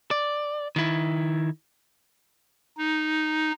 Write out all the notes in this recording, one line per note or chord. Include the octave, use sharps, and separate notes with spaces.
D5
D#3 E4
D#4